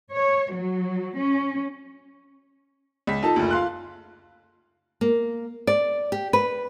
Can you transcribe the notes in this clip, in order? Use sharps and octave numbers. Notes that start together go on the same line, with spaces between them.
C#5
F#3
C#4
C#2 B6
D#4 F4 A4 A5
F#1 D2
F5 C6 F#6
A#3
D5
G4
B4